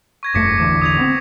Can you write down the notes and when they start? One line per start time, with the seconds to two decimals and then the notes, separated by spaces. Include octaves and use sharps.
0.23 C#6 G#6 A#6
0.34 F1 G2 A3 D6 B6 C#7
0.58 A1 E2 D3 D6
0.81 D#6 G#6 F7
0.98 B3 C4